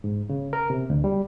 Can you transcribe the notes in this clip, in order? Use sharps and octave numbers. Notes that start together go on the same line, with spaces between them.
G#2
C#3
A#4
C3
D2
G3